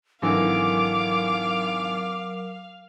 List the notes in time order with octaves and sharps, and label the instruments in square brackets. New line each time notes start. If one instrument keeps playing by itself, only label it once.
[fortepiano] G#1 D3 E3 [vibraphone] F#3 A#4 [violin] F5 [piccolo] D6